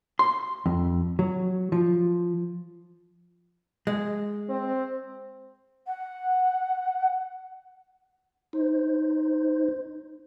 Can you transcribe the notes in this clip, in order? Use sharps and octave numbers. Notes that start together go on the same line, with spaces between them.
C6
F2
F#3
F3
G#3
C4
F#5
D#4 C5